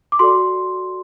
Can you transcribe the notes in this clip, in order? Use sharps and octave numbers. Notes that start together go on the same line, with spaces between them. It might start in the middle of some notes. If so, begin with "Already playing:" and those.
D6
F#4 A4 D5 C6